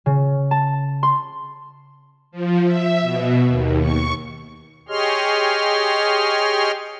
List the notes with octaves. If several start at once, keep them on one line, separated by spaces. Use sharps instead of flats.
C#3
A5
C6
F3
E5
B2
D#2
C#6
G4 G#4 C#5 D#5 C6 F6